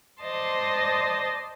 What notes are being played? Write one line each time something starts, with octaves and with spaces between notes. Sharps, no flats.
C5 D5 D#5 A5 C6